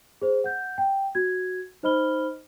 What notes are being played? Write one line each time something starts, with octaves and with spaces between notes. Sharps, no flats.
G#4 C5
F#5 G6
G5
F#4 G#6
D#4 C5 D#5 B5 F6 G7